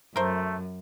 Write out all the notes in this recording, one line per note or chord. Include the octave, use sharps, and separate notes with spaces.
F#2 A3 A#4 C5